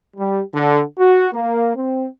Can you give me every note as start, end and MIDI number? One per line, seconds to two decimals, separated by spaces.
0.17 0.40 55
0.55 0.81 50
0.98 1.29 66
1.33 1.75 58
1.75 2.06 60